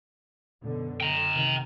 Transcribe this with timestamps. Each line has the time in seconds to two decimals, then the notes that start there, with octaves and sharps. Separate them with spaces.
0.63 F#2 B2 D3
1.01 G5 A#5
1.34 C3 D#3